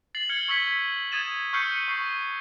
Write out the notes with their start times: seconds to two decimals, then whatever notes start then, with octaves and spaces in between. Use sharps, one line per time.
0.15 A6 C7 F#7
0.29 F6 G#6 C#7 F#7 G7
0.48 C#6 E6 G#6 B6 C#7
1.12 D#6 G#6 A6 D#7 E7
1.53 C#6 E6 F6 G6 C7 C#7
1.88 C#6 C7